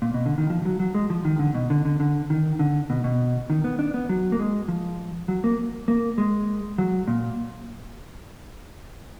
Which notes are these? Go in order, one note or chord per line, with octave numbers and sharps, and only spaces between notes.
A#2
B2
D3
D#3
F3
F#3
F#3
G#3
F3
D#3
D3
B2
D3
D3
D3
D#3
D3
B2
B2
D#3
B3
D4
B3
F#3
A#3
G#3
F3
F#3
A#3
A#3
G#3
F#3
A#2